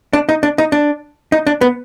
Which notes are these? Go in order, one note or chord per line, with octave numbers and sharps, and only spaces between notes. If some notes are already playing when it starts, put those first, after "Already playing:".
D4
D#4
D4
D#4
D4
D#4
D4
B3